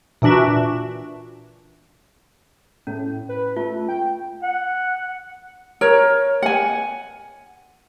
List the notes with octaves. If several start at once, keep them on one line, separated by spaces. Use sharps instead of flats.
A#2 E3 D4 F#4 E5
A2 C#4
B4
A3 F4
G5
F#5
A#4 C#5
F#5 G#5